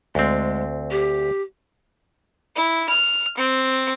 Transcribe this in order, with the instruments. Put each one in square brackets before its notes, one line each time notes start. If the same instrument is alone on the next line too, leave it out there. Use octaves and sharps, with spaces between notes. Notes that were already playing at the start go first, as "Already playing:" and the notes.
[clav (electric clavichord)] D2 C4 [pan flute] G#3
[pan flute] G4
[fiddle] E4
F6
C4